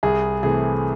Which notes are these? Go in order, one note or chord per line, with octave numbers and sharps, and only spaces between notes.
C2 G#4
C3 E3 A3 G#4